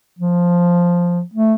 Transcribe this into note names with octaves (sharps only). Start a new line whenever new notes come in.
F3
A3